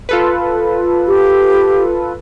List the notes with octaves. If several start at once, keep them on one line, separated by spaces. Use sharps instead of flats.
F4 A4 B4
G4